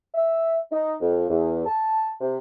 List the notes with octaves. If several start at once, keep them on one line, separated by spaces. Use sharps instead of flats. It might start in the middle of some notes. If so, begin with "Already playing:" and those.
E5
D#4
F2
E2
A5
C3